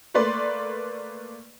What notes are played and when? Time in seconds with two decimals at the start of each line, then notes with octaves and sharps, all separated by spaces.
0.14 A3 A#3 B4 D5 C6